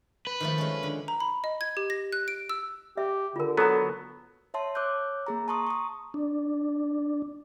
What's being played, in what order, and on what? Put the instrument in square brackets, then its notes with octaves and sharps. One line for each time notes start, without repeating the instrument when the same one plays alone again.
[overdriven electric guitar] B4
[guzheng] D#3 F3 A3
G#3 C#4
D3
[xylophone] A#5
B5
D#5
G#6
G4
A#6
F#6
D7
E6
[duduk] G4 [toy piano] E5
[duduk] D3 [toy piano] F4 A#4
[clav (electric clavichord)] F#3 B3 [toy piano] A4 A#5
[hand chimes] C#5 E5 A5 C6
C#5 D6 E6 F#6 G6
A#3 G#4 A#5
A5 A#5 C6 C#6 D#6
C#6 D#6
[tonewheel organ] D4